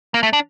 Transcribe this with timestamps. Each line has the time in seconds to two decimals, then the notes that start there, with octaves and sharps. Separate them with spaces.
0.14 A#3
0.23 A3
0.33 D4